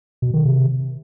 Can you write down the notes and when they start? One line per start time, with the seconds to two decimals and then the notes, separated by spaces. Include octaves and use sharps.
0.22 B2
0.34 D#3
0.45 C3